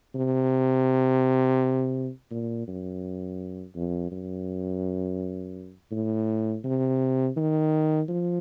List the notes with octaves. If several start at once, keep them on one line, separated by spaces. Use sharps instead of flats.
C3
A#2
F#2
F2
F#2
A2
C3
D#3
F3